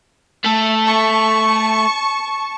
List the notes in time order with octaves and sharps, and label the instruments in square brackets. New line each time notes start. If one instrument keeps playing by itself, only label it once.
[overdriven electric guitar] A3 A4
[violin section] A5 C#6